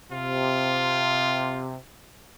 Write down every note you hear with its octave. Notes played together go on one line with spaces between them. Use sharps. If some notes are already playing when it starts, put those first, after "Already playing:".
C3 F4